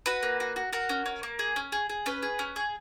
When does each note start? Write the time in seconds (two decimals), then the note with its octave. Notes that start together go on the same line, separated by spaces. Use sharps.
0.06 F#4 B4
0.23 A#3
0.40 F#4
0.56 F#4
0.73 F#4 A#4
0.89 C#4
1.06 C#4
1.23 A#3
1.39 G#4
1.56 C#4
1.72 G#4
1.90 G#4
2.06 C#4 B4
2.23 G#4
2.39 C#4
2.56 G#4